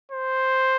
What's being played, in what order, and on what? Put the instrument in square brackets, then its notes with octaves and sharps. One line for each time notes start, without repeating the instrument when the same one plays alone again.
[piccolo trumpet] C5